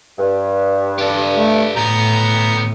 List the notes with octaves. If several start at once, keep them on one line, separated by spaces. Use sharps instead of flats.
G2
G4 A4
A3
D2 A2 B3 A#5 G6